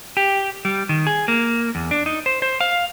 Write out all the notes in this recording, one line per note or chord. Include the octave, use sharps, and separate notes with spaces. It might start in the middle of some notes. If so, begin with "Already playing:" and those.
G4
G3
D#3
G#4
A#3
E2
D4
D#4
C5
C5
F5